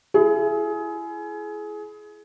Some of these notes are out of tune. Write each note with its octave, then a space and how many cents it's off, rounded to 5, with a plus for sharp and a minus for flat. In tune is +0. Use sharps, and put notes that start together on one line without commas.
E4 +30 G#4 +25